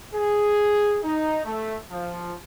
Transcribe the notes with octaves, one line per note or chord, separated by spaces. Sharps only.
G#4
D#4
A3
F3